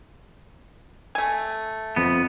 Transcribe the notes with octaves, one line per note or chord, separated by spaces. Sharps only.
A3 G#5
F2 B3